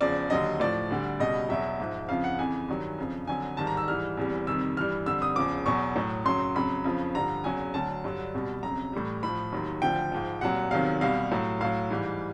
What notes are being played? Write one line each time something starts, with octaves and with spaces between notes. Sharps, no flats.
E2 C#3 F3 D5
D#2 D3 F#3 D#5
A2 F3 D5
D2 D3 G3
C#2 B2 G3 D#5
E2 B2 F#3 E5
G#2 F3
F2 C#3 F3 F5
F#5
F2 C#3 E3 G#5
G2 D#3 F#3
F2 C#3 F3
F2 D3 F#3 G#5
G#2 D#3 G3 A5
A#5
E6
G#2 E3 G3 F6
E2 C3 E3 G3
F2 C3 D#3 G3 E6
G2 E3 G3 F6
F2 D3 G3 E6
D#6
E2 C#3 F3 D6
E2 B2 F#3 C#6
A2 F#3
F#2 C#3 F#3 C6
F2 C#3 F#3 B5
F2 C#3 F3
G2 D3 F3 A#5
E2 C#3 F#3 G#5
D2 D3 F#3 A5
G2 D3 F#3
C2 B2 G3
F2 C#3 F#3 A#5
A2 E3 G3
A2 F3 B5
D#2 D#3 F#3
D2 D3 F3 G5
G#2 F3
C2 A#2 F#3 F#5
E2 C3 D#3 F#3 F5
C2 B2 G3 F5
A2 F#3
A2 F#3 F5
G#2 E3 G3